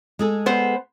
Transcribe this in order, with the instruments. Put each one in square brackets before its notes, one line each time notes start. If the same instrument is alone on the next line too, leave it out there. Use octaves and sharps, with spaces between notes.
[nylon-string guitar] G#3 G#4 A4
[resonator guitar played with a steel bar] B3 C5